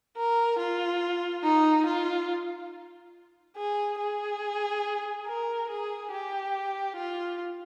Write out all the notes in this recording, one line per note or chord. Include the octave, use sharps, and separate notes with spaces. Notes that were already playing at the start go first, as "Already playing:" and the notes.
A#4
F4
D#4
F4
G#4
G#4
A#4
G#4
G4
F4